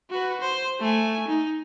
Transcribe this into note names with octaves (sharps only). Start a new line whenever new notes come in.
F#4 B4
C5
A3 G#5
D#4